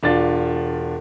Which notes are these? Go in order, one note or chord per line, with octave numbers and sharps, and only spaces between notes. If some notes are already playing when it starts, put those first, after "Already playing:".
E1 D4 F4 A6